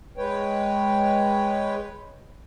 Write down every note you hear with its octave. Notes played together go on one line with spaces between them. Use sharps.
G#3 B4 C#5 G5